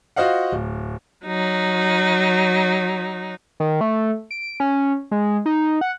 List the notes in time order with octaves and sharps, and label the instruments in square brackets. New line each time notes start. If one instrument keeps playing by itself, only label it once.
[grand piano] F4 F#4 C5 D#5 F5 F#5
D1
[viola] F#3 D#4
[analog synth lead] D#3
A3
D7
C#4
G#3
D#4
F#5